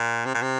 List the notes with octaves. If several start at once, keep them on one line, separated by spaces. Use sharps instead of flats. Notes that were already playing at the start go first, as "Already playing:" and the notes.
Already playing: A#2
C3
A#2
C3